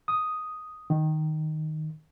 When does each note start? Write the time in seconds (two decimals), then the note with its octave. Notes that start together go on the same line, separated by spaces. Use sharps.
0.08 D#6
0.90 D#3